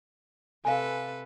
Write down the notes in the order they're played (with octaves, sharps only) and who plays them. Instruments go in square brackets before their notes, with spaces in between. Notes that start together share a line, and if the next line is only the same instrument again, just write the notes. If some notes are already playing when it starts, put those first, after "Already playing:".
[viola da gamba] C3 A4 B4 [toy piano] F5 G#5